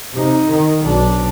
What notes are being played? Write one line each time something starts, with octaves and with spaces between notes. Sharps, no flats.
C3 D#4
D#3
B1 D4